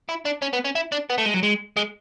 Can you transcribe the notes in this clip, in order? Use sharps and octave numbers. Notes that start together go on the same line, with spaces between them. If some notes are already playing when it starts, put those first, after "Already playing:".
E4
D4
C#4
B3
C#4
E4
D4
B3
A3
G#3
F#3
G#3
G#3